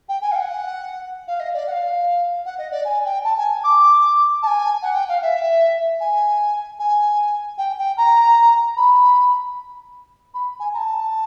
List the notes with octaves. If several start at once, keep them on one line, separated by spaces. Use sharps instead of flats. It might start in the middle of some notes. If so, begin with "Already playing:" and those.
G5
G#5
F5
G5
F#5
F5
D#5
D5
F#5
F5
F#5
D#5
D5
G#5
G5
A5
G#5
D6
A5
G#5
F#5
G5
F5
E5
G#5
G#5
G5
G5
A#5
B5
B5
G#5
A#5
A5